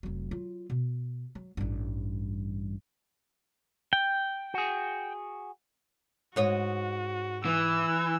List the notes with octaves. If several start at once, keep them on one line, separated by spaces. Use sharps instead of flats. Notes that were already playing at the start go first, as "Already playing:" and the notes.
F1 F#3
F#3 F4
B2
F#3
A1 G2
G5
F#4 G#4
G#2 F#4 C#5 D#5
E3 E6